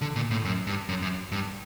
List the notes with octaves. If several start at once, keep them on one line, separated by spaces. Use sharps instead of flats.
D3
A#2
A2
F#2
G2
F#2
F#2
G2